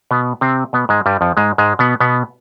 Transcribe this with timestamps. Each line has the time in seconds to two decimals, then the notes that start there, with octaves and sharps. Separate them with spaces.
0.11 B2 B3
0.41 C3 C4
0.73 B2 B3
0.89 G#2 G#3
1.06 G2 G3
1.21 F2 F3
1.37 G#2 G#3
1.58 G#2 G#3
1.79 B2 B3
2.00 B2 B3